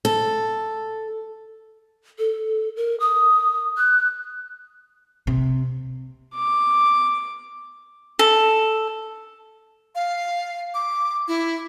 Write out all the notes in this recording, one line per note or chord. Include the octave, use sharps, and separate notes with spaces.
A4
A4
A#4
D#6
F#6
C3
D6
A4
F5
D6
E4